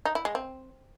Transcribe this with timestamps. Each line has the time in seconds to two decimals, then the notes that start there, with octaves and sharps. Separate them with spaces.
0.05 D#4
0.15 E4
0.25 G#3
0.35 C4